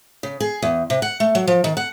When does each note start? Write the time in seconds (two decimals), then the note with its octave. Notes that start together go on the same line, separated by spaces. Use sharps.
0.23 C#3
0.40 G#4
0.62 E2
0.90 C3
1.02 F#5
1.20 A3
1.35 F#3
1.47 F3
1.64 D#3
1.77 F#5